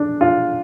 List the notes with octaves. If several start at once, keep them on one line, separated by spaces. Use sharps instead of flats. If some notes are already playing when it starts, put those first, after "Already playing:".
Already playing: D4
F4